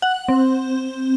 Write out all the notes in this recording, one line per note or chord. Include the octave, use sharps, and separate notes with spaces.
F#5
C4